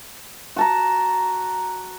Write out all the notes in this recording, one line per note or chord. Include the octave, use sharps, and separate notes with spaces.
F#4 A5 A#5